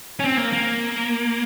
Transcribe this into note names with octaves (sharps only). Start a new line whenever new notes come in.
C#4
C4
A#3
A#3